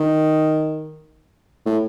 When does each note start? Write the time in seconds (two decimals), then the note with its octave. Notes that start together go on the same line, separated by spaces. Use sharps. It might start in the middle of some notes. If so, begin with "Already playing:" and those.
Already playing: D#3
1.66 A2